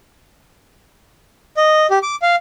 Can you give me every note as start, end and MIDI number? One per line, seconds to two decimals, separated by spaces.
1.57 1.87 75
1.91 1.99 67
2.03 2.15 86
2.22 2.36 77